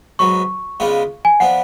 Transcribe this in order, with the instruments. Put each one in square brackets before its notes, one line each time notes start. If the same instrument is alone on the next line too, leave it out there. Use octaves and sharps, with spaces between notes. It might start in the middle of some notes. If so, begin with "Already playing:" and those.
[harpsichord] G#2 F#3 B3 [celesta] C#6
[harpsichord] C#3 G#3 B3 D4 F4
[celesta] G#5
[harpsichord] F3 B3 D4 [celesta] F#5